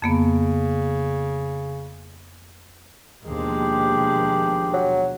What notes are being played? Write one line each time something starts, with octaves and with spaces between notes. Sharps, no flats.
F2 C#3 A#3 B3
D#2 B2 F3 G#3 D4 G4
F#3